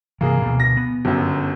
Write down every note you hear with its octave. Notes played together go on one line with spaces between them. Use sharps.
G2 C3 E3 A#3 G#4
D2 B2
A#6
B3
G1 F#2